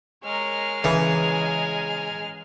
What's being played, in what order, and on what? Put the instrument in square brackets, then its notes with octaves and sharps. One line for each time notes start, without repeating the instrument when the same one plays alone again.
[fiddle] G#3 F6 [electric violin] A#4 C#5
[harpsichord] C#3 [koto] E3 [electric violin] G#5 A#5